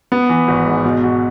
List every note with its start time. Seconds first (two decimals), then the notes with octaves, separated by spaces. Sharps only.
0.12 B3
0.29 E3
0.48 G#1
0.66 G#2
0.85 B2
1.03 F#4